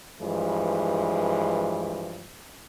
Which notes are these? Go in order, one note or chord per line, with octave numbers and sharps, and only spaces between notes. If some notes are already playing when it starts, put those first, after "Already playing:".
G2 E3 F3 G#3